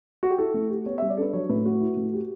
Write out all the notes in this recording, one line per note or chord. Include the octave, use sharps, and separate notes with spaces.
F#4
G4
E4 A4
A3
G4
B3 C#5
G3 E5
D5
D4 A4 B4
F#3 C#5
A2 B4
A3 F#4
E4
A3
G4